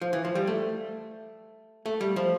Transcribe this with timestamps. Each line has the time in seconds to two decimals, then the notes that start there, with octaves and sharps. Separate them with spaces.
0.01 F3
0.13 E3
0.25 F3
0.35 G3
0.47 A3
1.86 A3
2.01 G3
2.16 F3